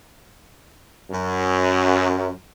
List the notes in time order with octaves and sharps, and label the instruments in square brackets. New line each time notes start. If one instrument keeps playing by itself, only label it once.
[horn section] F#2